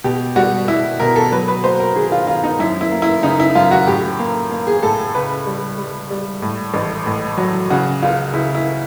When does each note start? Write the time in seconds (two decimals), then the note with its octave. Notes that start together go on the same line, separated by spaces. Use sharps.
0.04 B2 G4
0.36 G3 F#4
0.68 G3 E4
1.00 B2 A#4
1.16 A4
1.32 F#3 B4
1.48 B4
1.64 A#3 C5
1.80 A#4
1.95 D#3 G#4
2.12 F4
2.27 D#3 F4
2.44 D#4
2.59 F#2 E4
2.81 E4
2.92 A#3
3.02 E4
3.23 C#3 D#4
3.40 E4
3.55 F#2 F4
3.71 F#4
3.87 A2 G4
4.19 A#3
4.51 A#3
4.67 G#4
4.82 A2 A4
5.15 C#2 B4
5.46 G3
5.78 G3
6.10 G3
6.42 A2
6.74 A1
7.06 A2
7.37 F#3
7.70 C#3 F#4
8.02 C#2 F4
8.33 C#2 E4
8.55 E4